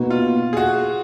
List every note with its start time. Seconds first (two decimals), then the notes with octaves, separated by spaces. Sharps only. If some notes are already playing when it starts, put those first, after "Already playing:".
Already playing: B2 A#3 D#4 F#4 B4
0.10 F4
0.53 G#4
0.57 F#4